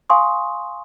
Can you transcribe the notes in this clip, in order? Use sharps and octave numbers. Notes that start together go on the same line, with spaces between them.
F5 G#5 C6 C#6 D#6